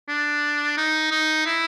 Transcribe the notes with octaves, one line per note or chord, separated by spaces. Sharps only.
D4
D#4
D#4
E4